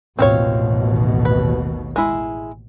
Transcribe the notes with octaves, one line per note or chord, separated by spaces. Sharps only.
A1 D#2 B2 C4 F4 C#5
B4
G#3 E4